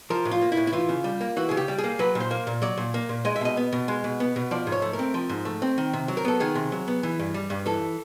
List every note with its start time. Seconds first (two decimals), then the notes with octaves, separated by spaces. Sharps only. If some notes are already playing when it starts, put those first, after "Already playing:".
0.10 F3 A#4
0.25 A2
0.31 F4
0.42 A#3
0.52 E4
0.57 A2
0.67 E4
0.73 E3 F4
0.89 C#3
1.04 G3
1.21 A#3
1.37 E3 F#4
1.49 C#3 G#4
1.57 G4
1.68 G3
1.78 G#4
1.84 A#3
1.99 F#3 B4
2.15 A#2
2.20 C5
2.31 A#3
2.47 A#2
2.62 F#3 D5
2.77 A#2
2.94 A#3
3.09 A#2
3.25 G#3 D#5
3.36 E5
3.41 B2 D#5
3.57 B3
3.73 B2
3.88 G#3
4.04 B2
4.20 B3
4.36 B2
4.51 F3 D5
4.67 G#2
4.72 C#5
4.82 A3
4.93 A#4
4.99 C4
5.14 F3
5.29 G#2
5.45 A3
5.62 C4
5.78 D#3
5.93 C3
6.08 F#3
6.17 A#4
6.25 B3 A4
6.40 D#3 G#4
6.55 C3
6.72 F#3
6.88 B3
7.03 E3
7.19 G2
7.34 G3
7.50 G2
7.66 E3 A4